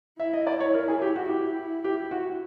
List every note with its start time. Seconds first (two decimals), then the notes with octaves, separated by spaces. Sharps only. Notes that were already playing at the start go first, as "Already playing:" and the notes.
0.19 E4 E5
0.33 D#5
0.47 D5
0.60 C#5
0.74 A#4
0.88 G#4
1.02 G4
1.16 F#4
1.29 E4 G4
1.84 G4
2.11 F#4